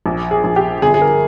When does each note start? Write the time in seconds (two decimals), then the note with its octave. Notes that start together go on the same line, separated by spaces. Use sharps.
0.06 A#1
0.31 G#4
0.44 A#1
0.56 G4
0.82 G1 G#4
0.94 G#4
1.01 A#4